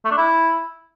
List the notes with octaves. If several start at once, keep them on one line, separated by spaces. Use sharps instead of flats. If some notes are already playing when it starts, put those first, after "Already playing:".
A3
D4
E4